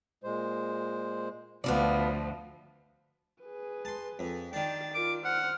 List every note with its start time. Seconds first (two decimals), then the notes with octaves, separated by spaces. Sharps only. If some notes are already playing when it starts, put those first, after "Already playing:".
0.24 A#2 G#3 C5
1.64 D2 F3 B3 F4 D5
3.43 G#4 B4
3.85 A5 C6
4.19 F2
4.53 D#3 D4 G5 A6
4.94 F4 A#4 D6
5.25 C5 F#5 F6